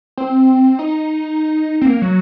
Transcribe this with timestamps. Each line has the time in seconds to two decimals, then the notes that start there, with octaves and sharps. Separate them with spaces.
0.18 C4
0.79 D#4
1.81 C4
1.86 A#3
2.02 F#3